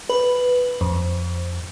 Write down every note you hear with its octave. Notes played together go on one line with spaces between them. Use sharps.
B4
F2